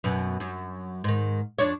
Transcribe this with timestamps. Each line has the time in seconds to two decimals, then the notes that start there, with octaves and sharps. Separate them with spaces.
0.04 F#2 B2
0.40 F#2
1.04 G#2 D#3
1.59 F2 D4 C#5